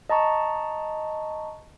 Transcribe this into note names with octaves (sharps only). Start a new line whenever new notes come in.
D#5 A5 A#5 C#6